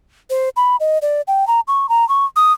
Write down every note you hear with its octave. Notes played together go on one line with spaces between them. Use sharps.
C5
B5
D#5
D5
G5
A#5
C#6
A#5
C#6
D#6